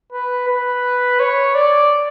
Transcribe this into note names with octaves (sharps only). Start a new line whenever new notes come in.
B4
B4
C#5
D5